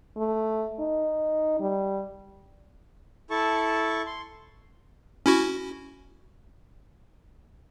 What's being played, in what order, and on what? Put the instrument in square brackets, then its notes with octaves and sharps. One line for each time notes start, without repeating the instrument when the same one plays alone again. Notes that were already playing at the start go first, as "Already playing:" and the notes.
[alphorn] A3
D#4
G3
[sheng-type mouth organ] E4 A4 A5 C#6
C6
[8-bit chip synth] C#4 E4 F#4